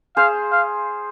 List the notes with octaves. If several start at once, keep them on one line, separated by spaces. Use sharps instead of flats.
G#4 C5 F5
F5